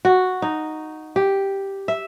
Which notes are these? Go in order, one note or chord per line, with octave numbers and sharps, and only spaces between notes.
F#4
D#4
G4
E5